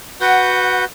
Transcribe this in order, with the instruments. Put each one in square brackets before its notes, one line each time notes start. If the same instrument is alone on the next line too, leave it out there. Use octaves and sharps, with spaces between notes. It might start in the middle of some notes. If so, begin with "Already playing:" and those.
[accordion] F#4 B4 G6 [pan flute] F#5